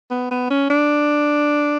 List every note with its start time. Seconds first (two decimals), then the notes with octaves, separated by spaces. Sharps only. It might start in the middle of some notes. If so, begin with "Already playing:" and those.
0.11 B3
0.31 B3
0.50 C#4
0.70 D4